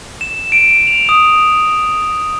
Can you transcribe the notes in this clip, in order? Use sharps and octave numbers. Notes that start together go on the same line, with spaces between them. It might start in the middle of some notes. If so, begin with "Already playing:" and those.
E7
D7
F7
D#6